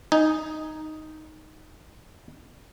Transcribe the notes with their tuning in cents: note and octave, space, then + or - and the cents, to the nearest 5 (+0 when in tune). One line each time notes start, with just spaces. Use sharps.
D#4 +0 G#5 +0